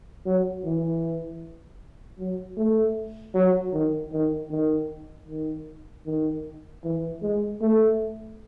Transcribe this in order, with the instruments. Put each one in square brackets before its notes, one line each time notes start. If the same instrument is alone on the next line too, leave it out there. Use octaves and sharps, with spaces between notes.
[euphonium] F#3
E3
F#3
A3
F#3
D#3
D#3
D#3
D#3
D#3
E3
G#3
A3